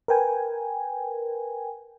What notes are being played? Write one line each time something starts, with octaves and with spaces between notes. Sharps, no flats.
A#4 B4 G5 G#5